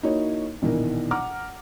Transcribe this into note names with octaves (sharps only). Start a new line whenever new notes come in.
A#3 D#4 E4 F#4 C#5
A#1 B2 D#3 E3 A#4
F#5 A#5 D6 F6